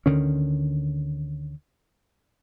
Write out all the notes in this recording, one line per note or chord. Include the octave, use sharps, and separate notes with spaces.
D2 D3 D#3 C#4